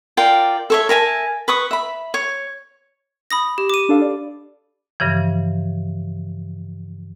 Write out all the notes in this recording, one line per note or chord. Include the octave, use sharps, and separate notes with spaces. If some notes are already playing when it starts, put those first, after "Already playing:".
F4 A#4 D5 G5
A4 C#5 E5
A#4 E5 G#5 A5
B4 C#6 D#6
E5 B5
C#5
B5 D#6 A#6
G4
D6 D#7
D4 A4 F5
D5
G2 C#3 E3 F3